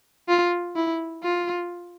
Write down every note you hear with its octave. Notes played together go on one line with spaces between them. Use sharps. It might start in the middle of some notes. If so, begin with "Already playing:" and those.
F4
E4
F4